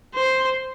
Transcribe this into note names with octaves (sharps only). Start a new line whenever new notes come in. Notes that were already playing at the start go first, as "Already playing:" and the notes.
C5